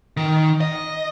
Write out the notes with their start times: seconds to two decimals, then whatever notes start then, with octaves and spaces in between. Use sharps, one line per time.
0.17 D#3
0.61 D#5